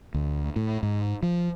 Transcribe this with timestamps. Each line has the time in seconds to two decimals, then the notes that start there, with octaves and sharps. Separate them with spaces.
0.14 D2
0.56 A2
0.83 G#2
1.23 F3